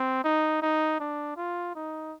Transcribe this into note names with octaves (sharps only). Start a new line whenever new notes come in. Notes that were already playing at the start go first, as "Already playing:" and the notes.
Already playing: C4
D#4
D#4
D4
F4
D#4